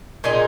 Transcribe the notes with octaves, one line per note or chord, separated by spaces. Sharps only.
A#2 G#3 D#4 G#4